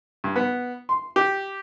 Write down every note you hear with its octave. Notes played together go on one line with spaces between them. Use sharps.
G2
B3
C6
G4